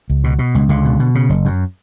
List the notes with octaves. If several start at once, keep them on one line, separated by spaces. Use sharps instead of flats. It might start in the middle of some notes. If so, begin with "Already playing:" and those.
C#2
B2
B2
C#2
C#2 D3
B2
B2
C#3
F#1
F#2